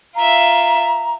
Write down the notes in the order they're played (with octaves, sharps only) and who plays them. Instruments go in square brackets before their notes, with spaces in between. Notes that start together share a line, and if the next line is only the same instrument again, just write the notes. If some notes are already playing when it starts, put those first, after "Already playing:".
[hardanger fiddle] F4 E5 [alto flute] A#5